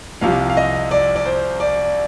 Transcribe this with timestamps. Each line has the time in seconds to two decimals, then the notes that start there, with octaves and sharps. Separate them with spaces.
0.21 C2 C3 F3 F5
0.50 F5
0.57 D#5
0.91 D5
1.16 D5
1.26 C5
1.60 D5